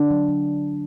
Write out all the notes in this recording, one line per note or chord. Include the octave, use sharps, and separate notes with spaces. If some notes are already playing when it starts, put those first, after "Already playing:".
Already playing: D3 D4
F#3
F#3